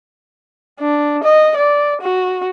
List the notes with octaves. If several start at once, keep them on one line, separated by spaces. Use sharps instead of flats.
D4
D#5
D5
F#4